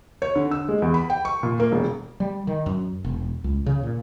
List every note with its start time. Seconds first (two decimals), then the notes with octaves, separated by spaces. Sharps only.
0.22 C#5
0.36 D3
0.51 E6
0.69 G#3
0.82 E2
0.94 B5
1.10 G5
1.25 C#6
1.43 A#2
1.60 A#3
1.72 E1
2.20 G3
2.47 D#3
2.66 F#2
3.04 E1
3.44 C#2
3.66 C#3
3.83 A#2